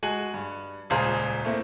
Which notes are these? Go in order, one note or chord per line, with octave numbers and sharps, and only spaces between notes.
G#3 F#4 G#5 G#6 F#7
G2
D#1 C#2 F4 G#4 C5 A#5
A3 A#3 C4 E4